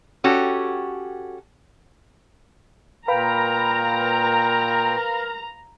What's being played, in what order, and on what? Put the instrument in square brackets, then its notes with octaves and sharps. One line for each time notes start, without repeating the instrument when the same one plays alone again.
[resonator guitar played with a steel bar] C#4 F#4 G4 A4
[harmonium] A#2 G5 [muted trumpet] A#4 [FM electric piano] B4 F5 B5 [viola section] A#5